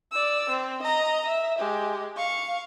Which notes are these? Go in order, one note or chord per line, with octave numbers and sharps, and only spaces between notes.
D5 E6
C4
D#5 A#5
E5
G#3 G4
F5 C#6